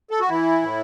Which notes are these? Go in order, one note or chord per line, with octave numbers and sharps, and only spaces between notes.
A4
F#4
E3 E4
A2